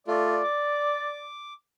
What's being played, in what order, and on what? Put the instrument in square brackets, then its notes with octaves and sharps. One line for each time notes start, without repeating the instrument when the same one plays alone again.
[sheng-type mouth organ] A3 F4 [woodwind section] D5
[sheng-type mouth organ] D6